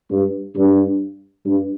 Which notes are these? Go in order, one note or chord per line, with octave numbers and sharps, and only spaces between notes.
G2
G2
G2